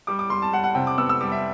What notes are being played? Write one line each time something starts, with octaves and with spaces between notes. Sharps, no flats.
G3 D6
D6
G3 C6
A5
G3 F#5
F#5
C3 G5
D6
B3 E6
E6
G3 D6
E5